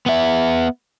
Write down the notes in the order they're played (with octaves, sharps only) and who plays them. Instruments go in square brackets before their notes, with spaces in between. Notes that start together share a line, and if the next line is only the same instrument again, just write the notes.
[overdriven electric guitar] B3 E5